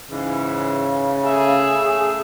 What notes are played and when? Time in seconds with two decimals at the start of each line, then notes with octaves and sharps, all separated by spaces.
0.11 G#2 C#3 E3
1.26 A3 G#4 E5